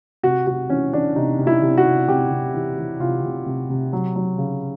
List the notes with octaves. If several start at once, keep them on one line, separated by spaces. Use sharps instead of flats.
C3 F#4
C3 F#4
E3 C#4
E3 D4
C3 D#4
C3
E4
C3
F#4
C3
C3 G4
C3
E3
E3
C3 F4
C3
C3
C3
F#3
F#3
C#3